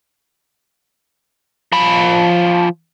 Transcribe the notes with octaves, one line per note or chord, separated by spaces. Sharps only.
F3 B5